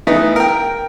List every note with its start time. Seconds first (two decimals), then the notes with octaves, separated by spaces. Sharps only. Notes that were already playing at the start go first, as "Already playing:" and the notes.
0.07 E3 A3 B3 D#4
0.36 A#4 G5